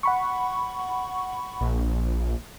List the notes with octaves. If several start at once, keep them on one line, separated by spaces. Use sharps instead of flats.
F#5 B5 C#6
A#1